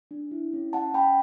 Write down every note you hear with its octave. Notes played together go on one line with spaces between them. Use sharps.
D4
E4
C#4
C#4 F#5 A5
C#4 G5 B5